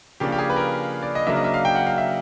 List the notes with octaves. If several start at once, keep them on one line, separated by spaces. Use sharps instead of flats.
C#3 F3 A#3 D4 G4
G4
G#4
B4
A#4
D5
D#5
C#3 F#3 A#3 D4 E5
D#5
E5
F5
G5
F#5
F5
E5